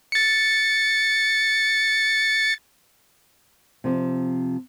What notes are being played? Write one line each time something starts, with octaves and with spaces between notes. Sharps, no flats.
A6 C#7
C3 F3 C4